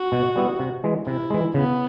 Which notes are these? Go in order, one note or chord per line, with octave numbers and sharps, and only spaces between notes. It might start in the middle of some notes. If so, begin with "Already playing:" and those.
Already playing: F#4
B2
G3 B3 E4
C3
E3 G#3
C3 E4
E3 G#3
C#3 B3